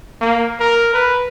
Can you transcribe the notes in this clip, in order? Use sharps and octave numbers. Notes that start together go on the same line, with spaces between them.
A#3
A#4
B4